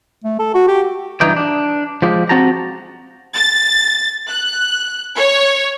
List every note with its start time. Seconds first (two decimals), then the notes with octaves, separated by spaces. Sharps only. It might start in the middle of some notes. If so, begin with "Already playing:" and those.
0.24 A3
0.39 A4
0.54 F#4
0.67 G4
1.21 G2 E3 D#4 G4 G5
1.36 D4
2.02 F3 G#3 G4
2.29 C4 F#4 G4 A5 A#5
3.35 A6
4.29 F#6
5.17 C#5